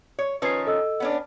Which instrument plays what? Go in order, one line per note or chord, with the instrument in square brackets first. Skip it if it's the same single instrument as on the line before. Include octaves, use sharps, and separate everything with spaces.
[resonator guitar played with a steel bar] C#5
[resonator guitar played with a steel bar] D#3 F3 C#4 [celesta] B4 C7
[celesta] A4 D#5 E6
[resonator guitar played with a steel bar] B3 C#4 D4